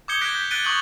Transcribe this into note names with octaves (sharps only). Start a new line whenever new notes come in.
D6 D#6 G6 G#6 C#7 G7
D6 F#6 G#6 A#6 B6 D7
G6 B6
F#6 A6 B6 D7 D#7 G7
C#6 D#6 F#6 A6 F#7